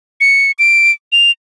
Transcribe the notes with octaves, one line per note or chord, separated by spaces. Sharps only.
C#7
D7
F7